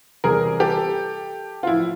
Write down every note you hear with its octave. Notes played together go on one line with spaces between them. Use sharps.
E2 C3 E3 G3 G#4 A#4
G4 A4
F4
A2 F3 E4